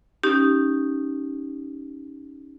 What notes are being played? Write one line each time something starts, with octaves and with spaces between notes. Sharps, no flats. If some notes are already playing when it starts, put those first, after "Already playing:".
C#4 D#4 G4